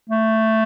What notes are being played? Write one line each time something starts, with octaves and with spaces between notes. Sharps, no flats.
A3